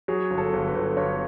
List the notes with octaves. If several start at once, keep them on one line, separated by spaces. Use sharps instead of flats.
F#3 G#4
G1
A4
G1
B4
G1
G1 C#5